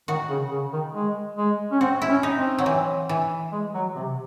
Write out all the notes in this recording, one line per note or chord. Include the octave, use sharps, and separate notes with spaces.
D#3 F#4
C#3
C#3
D#3
G#3
G#3
C#4
C4 F#4
E4
C#4
D#4
C4
F#3
E3
E3
G#3
F#3
C3